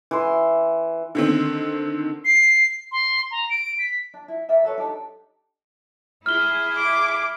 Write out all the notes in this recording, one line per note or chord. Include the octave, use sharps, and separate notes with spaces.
E3 C6
D3 D#3 C4
C7
C6
A#5
D7
B6
D4
E4
A#4 D5 E5 G#5
F#4 A4 B4 C#5
D4 D#4 G4 A4
E4 G#4 F6 G7
D6